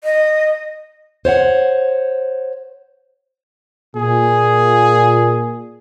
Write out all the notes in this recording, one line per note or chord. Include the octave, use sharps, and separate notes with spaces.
D#5
C5 C#5 F5 F#5
A#2 G#4